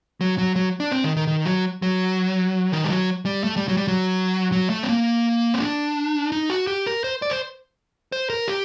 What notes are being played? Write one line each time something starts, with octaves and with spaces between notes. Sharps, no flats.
F#3
F#3
F#3
D4
C4
D#3
D#3
D#3
F#3
F#3
D#3
G3
F#3
G3
A3
G3
F#3
G3
F#3
F#3
A3
C4
A#3
C4
D4
D#4
F#4
G4
A#4
C5
D5
C5
C5
A#4
G4